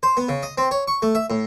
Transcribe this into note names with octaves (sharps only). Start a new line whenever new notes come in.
C5
B3
C#3
D#5
C4
C#5
C#6
A3
E5
A2